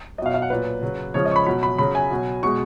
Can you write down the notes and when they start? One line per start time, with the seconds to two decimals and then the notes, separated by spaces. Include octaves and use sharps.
0.18 F#3 D#5
0.22 B2 F5
0.34 F5
0.42 F#5
0.50 A#2 F#3 B4
0.82 C#3 F#3
1.14 C#3 F3 G#3 C#5
1.25 D#5
1.31 C#6
1.36 B5
1.46 B2 F#3 B5
1.63 B5
1.78 C#3 F#3 B5
1.95 G#5
2.11 B2 F#3
2.43 B2 G#3 C#6